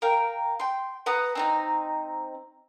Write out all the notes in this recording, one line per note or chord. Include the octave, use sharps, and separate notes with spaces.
A#4 F5 G5
G5 C6
B4 F#5 A#5 D#6
C4 D#4 A#5